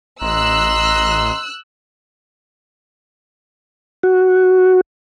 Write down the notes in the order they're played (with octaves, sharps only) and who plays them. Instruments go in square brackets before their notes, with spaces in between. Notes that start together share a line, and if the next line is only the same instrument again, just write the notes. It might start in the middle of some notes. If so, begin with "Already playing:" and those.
[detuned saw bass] A1 [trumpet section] D#5 A#5 C6 [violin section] E6 F#6
[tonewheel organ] F#4